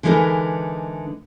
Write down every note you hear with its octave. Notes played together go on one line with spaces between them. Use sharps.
D3 E3 G#3 D#4 A#4 B4